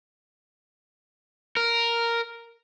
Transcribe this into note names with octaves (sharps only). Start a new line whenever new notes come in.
A#4